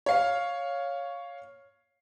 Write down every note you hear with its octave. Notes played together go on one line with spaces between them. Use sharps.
C#5 F5